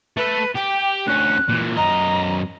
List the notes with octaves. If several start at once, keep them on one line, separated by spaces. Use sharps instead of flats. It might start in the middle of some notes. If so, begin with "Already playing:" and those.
A3 A4 B4
G4 G5
D2 C#4 F#6
A#2 E3
F#2 D#5 A#5